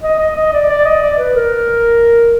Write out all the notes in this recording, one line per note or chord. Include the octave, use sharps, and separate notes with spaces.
D#5
D#5
D#5
D5
D5
D#5
D5
B4
A#4